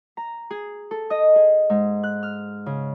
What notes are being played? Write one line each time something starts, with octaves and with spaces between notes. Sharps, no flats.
A#5
G#4
A4
D#5
G#4
G#2
F#6
F6
C#3